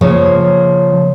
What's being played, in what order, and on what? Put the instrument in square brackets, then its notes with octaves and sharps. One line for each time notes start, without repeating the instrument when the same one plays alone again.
[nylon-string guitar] C#3 F3 A#3 C#5